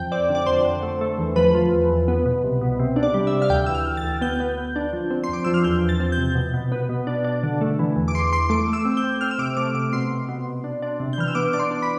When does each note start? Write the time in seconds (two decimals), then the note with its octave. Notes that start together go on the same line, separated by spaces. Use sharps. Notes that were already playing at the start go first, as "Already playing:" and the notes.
Already playing: F2 G5
0.12 C4 D5
0.29 D3
0.35 D5
0.46 F2 C5
0.65 D3
0.83 A3
1.01 A3
1.18 E2
1.36 F3 B4
1.55 F3
1.72 E2
1.90 E2
2.08 B3
2.26 B2
2.44 C2
2.61 B2
2.80 C3
2.96 D4
3.03 D5
3.14 G3
3.27 E5
3.33 C3
3.42 F5
3.50 D2 G5
3.66 E3 E6
3.75 F6
3.86 D2
3.97 A6
4.04 D2
4.21 B3 G6
4.40 B3
4.57 B3
4.76 D4
4.93 F3
5.10 C4
5.24 C6
5.29 F2 D6
5.44 F3 E6
5.54 F6
5.64 E2 G6
5.83 E2
5.89 A6
6.00 C4
6.12 G6
6.17 C3
6.35 B2
6.54 B2
6.72 B3
6.89 B2
7.07 D4
7.24 D4
7.43 D3
7.61 A3
7.79 E3
7.96 E2
8.08 D6
8.14 E2 C6
8.32 E2 C6
8.50 A3 D6
8.68 A3
8.73 E6
8.85 C4
8.97 G6
9.04 C4
9.21 C4 F6
9.31 E6
9.39 C3 D6
9.57 A3 D6
9.74 C3 D6
9.93 B2 C6
10.11 B2
10.29 B2
10.47 B2
10.64 D4
10.82 D4
11.00 C3
11.13 G6
11.18 E3 F6
11.28 E6
11.35 B3 D6
11.53 D4 D6
11.60 C6
11.71 D4
11.82 B5